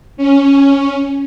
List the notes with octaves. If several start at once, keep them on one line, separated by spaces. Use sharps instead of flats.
C#4